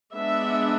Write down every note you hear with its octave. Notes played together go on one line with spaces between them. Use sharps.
G#3 B3 D4 E5